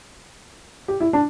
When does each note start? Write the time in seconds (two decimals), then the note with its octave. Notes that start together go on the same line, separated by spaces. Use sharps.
0.88 G4
1.00 E4
1.13 D4